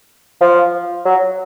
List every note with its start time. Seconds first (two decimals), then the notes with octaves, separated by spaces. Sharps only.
0.41 F3
1.06 F#3